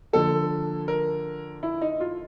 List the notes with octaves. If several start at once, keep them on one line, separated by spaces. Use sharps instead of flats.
D3 F3 A#3 A4
A#4
E4
D#4
F4